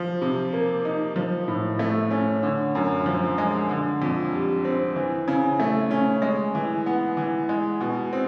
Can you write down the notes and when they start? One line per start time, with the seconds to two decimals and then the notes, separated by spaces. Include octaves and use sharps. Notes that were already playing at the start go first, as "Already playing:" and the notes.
Already playing: F3
0.21 C3
0.53 A#3
0.85 D#4
1.16 F3
1.48 A2
1.79 A3
2.11 C#4
2.43 D3
2.75 F#2
3.06 F3
3.38 G#3
3.69 D3
4.02 F2
4.33 G3
4.65 C4
4.96 E3
5.28 C#3
5.60 A3
5.91 C#4
6.22 G#3
6.55 E3
6.86 B3
7.17 E3
7.49 G#3
7.81 B2
8.13 C4